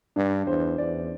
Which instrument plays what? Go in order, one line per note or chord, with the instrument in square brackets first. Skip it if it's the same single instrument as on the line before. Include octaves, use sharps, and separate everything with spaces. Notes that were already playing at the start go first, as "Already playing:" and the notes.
[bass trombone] G2 [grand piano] D4
[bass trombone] E2 [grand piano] C5
[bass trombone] E2 [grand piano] D5